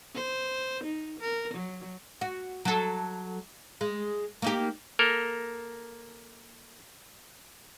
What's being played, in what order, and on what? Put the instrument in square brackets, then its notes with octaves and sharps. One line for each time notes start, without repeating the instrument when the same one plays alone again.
[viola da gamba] C5
D#4
A#4
F#3
[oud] F#4
F#3 A4
G#3
A#3 D#4 G4
[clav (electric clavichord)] A#3 A4 A#4